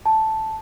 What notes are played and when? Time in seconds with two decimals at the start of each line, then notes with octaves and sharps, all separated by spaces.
0.06 A5